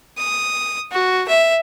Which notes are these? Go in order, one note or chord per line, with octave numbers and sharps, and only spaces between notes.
D#6
F#4
E5